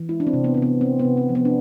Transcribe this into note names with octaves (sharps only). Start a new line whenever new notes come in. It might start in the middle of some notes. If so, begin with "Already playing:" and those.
Already playing: E3
G#3 E4
D4
C4
C3
B3
C4
C3 B3
C3 C4
B3
C3
C4
F3
B3
D4